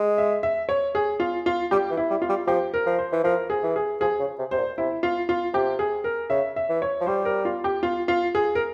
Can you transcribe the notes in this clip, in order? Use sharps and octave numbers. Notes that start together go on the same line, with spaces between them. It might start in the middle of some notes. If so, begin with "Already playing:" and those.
Already playing: G#3
E5
E5
C#5
G#4
F4
F4
G3 G4
E3
E4
G3
F4
G3
F3 G4
A#4
F3
C5
E3
F3 A#4
G#4
E3
G#4
F3 G#4
C#3
C3
C3 C5
A#2
C3 E4
F4
F4
C3 G4
G#4
A#4
C#3 E5
E5
E3
C#5
F3
G3 C5
A#4
F4
G4
F4
F4
G#4
A#4